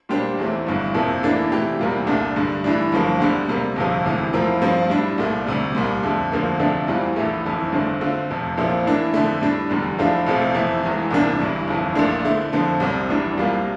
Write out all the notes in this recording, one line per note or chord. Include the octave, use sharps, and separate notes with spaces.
A#2 G3 D4 G4 C5
E2 E3 A3 C4
G1 G2 E3
F2 C3 F3 A#3 E4
A2 E3 A#3 D4 A4
C3 E3 A3 E4 G4
E2 C3 G3 A#3 F4
C2 A#2 A3 D4
G2 D3 G3
A2 E3 G3 D4
G1 G2 F3 A#3
D2 D3 G3
C3 G3 A#3
G1 F2 C3 F3
E1 D2 C3 E3
A2 F3 C4 F4 A#4
G2 F3 C4 F4
A2 G3 D4
C2 A#2 A3
D2 C3 G3
C2 A#2 G3
F2 D3 A3
D2 D3 F3 A#3 F4
D2 C3 F3 A3 D4
E2 E3 G3 C4 F4
A#1 A2 E3 A3
G1 F2 E3
G1 G2 D3 A3 C4
D3 A3 C4 F4
F1 F2 C3
A#1 A#2 F3 C4 E4
A2 E3 A#3 D4
F2 D3 A3
A2 G3 D4
F1 E2 D3 G3
A2 F3 A3 D4 F4
F1 F2 C3 F3 A3
F2 C3 E3 A3
E1 E2 E3
C2 C3 E3 A#3 D4
G1 G2 E3 G3
G1 F2 E3
A#1 A#2 A3 D4
D3 A3 E4
F2 D3 F3
C2 C3 G3 C4
F1 E2 E3 G3 D4
C2 C3 G3 A#3 F4